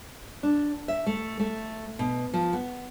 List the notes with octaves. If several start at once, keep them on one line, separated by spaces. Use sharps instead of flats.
D4
E5
A3
A3
B2
F3
B3